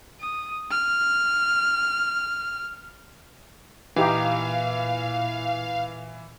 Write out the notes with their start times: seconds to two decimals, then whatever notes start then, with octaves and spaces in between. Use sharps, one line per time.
0.21 D#6
0.71 F6
3.96 A#2 E3 D#4 G4 F5